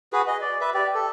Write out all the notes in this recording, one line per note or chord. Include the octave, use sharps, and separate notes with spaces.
F#4 G#4 B4
D#5
D5
B4 E5
G4 D5
A4